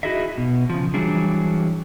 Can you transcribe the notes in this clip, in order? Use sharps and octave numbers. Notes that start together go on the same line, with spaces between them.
D#4 E4 F#4 G#4 D#5 E5
B2
C#3 F3
E3 F#3 G3 D4 E4 G#4